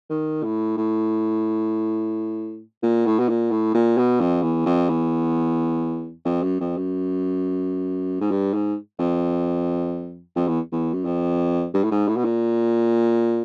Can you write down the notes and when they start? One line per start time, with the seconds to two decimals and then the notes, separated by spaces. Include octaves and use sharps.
0.10 D#3
0.44 A2
0.77 A2
2.83 A#2
3.06 A2
3.19 B2
3.29 A#2
3.51 A2
3.74 A#2
3.98 B2
4.20 F2
4.42 E2
4.66 F2
4.89 E2
6.25 F2
6.43 F#2
6.60 F2
6.77 F#2
8.21 G#2
8.31 G2
8.54 G#2
8.99 F2
10.36 F2
10.48 E2
10.72 E2
10.94 F#2
11.05 F2
11.74 G2
11.84 A2
11.91 G#2
12.08 A2
12.17 B2
12.24 A#2